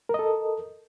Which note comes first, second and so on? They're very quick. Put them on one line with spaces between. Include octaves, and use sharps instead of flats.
A#4 D#5 A4